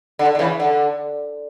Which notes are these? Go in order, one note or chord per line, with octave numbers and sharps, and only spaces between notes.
D3
D3
C#3 E3
D3